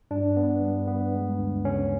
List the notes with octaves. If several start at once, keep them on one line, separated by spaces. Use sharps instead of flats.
G2 D4
B3
G2
B3
G#3
D2
C#3 C#4